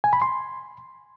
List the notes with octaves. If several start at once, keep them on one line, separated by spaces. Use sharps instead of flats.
G#5
B5
C6